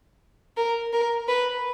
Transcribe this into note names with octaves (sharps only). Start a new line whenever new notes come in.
A#4
A#4
B4